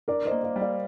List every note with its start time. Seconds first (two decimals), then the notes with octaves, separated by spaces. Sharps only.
0.08 D4 A#4 D5
0.25 C5 D#5
0.31 A#3
0.43 D5 F5
0.56 G3
0.61 D5 F5